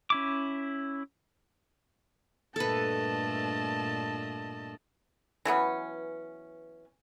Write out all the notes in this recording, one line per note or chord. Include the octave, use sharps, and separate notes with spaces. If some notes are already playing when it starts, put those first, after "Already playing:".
C#4 E4 D6
G2 A#2 A3 A4 B4 D#5 A5
E3 F#3 B3 C#4